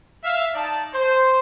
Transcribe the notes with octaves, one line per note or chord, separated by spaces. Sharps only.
E5 F5
D#4 D5 A5
C5